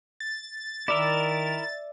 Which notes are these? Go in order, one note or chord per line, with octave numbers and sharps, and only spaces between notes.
A6
D#3 E4 A#4 D5 E5